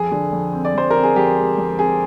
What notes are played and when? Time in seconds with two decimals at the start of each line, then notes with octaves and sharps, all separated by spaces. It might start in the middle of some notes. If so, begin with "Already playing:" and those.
Already playing: F2 G#4
0.11 D3
0.32 F2
0.53 C4
0.65 D5
0.74 F2 C5
0.90 C4 A#4
1.03 G#4
1.16 F2 G4
1.37 G#3
1.58 F2
1.79 C4 G#4